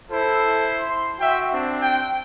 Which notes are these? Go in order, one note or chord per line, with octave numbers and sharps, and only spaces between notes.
E4 A4 C5
C6
F#4 E5 G5
C4 D4
G5